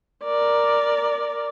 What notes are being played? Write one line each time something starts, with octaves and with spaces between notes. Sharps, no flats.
A#4 D5